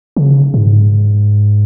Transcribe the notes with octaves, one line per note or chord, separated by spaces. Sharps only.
C#3
G#2